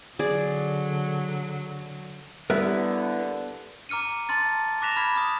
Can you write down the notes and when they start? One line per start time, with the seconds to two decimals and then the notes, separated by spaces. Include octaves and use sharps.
0.19 D3 F#3 G#4 D5
2.50 D3 G3 B3 E4 G4 A#4 B4 E5
3.89 A#5 D6 F6 C#7 D#7
4.29 A5 C6 F6 A6
4.82 D6 F#6 A#6 B6 E7 F7
4.96 B5 D6 F6 G#6 A#6 B6
5.15 D#6 F6